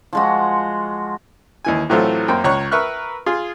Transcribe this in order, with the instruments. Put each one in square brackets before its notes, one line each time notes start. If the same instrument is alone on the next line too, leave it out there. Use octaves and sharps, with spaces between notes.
[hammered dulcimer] F3 G#3 F#4
[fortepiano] D#2 E3 G#5
A2 E3 F#3 A3 C4 F4
F#2 A#3 C4 G5 C6
C#2 C#5 A#5 C#6 F#6
A#4 B4 E5 C#6 F6 F#6
F4 G#4